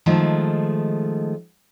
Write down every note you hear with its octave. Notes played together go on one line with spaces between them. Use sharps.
D#3 F3 G#3 A3